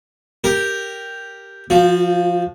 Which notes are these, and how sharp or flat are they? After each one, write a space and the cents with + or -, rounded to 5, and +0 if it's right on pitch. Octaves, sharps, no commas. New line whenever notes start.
G4 +0 A#4 +0
F3 +0 F#4 -40